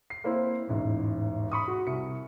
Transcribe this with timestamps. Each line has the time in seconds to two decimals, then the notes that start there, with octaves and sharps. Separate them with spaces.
0.10 C7
0.24 A#3 C4 E4 C5
0.68 E1 A1 G#2
1.52 B5 C#6 D#6
1.68 F#4
1.87 C2 C#7